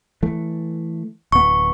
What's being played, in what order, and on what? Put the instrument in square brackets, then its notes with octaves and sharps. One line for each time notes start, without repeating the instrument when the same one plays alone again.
[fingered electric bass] E3 A3
[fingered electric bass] D1 B3 [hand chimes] C#6